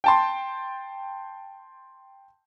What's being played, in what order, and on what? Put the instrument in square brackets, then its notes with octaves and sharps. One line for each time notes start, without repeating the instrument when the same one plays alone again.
[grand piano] G5 A5 C6